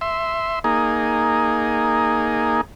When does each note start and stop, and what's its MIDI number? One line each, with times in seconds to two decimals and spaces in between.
0.01 0.59 76
0.01 0.59 84
0.64 2.61 58
0.64 2.61 63
0.64 2.61 68